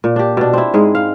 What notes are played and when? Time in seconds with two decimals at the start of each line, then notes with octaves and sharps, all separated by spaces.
0.04 A#2
0.16 D4 G4
0.37 B2 D4
0.53 C4 E4
0.74 G#2 G#3 G#4
0.95 F5